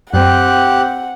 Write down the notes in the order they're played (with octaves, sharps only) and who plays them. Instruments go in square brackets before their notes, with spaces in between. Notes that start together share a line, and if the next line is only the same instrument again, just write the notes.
[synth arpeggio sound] F#2 [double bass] C4 [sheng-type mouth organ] G4 F#6 [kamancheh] F#5